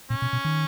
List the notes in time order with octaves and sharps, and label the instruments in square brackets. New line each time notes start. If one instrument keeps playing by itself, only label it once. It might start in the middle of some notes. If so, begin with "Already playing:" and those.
[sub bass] A#2 [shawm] C#4
[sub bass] B2
B2
D#3